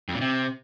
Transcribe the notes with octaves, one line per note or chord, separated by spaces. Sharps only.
F2
A#2
C3